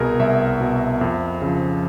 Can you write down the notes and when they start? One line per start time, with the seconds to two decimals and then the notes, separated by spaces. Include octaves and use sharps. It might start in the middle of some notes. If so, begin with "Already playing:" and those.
Already playing: C2 B2 G#4 A#4
0.19 C2 E5
0.61 B2
1.01 F2
1.42 C#3 F3